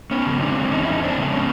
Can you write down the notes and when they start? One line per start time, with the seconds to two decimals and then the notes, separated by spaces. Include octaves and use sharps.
0.11 B3 C#4
0.26 C#3 F3 G#3
0.41 C4 D4
0.72 E2 C#4 D#4
0.84 E4
0.93 D#4
1.03 C4 D4
1.18 C#3 F3 G#3
1.32 B3 C#4